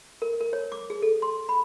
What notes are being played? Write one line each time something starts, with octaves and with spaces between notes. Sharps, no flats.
A#4
A#4
C#5
D6
G#4
A4
C6
B5